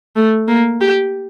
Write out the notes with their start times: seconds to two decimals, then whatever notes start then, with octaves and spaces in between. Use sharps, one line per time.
0.16 A3
0.48 A#3
0.81 G4